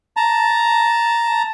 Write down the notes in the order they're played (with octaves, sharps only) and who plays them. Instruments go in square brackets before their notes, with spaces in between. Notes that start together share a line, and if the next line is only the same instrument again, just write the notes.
[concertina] A5 A#5